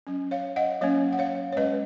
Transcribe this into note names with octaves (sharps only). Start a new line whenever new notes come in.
F#3 C#4
C#5 F5
D#5 F#5
F#3 A#3 C#4 C#5 F5
F#5
C#5 F5
C#5
G#3 C#4 B4 D#5